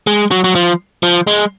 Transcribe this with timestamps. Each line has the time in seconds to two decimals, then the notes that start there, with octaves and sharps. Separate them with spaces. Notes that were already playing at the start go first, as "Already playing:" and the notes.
0.07 G#3
0.31 F#3
0.44 F#3
0.55 F3
1.03 F3
1.27 G#3